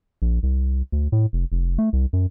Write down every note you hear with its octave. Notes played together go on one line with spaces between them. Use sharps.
A#1
C2
D2
A2
F1
F1
A3
C2
F#2